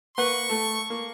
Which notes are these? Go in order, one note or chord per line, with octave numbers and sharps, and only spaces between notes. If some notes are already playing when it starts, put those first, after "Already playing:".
A#3 B4 F#5 C#6
A3 A4
A#3